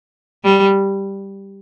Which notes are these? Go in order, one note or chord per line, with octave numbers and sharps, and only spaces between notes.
G3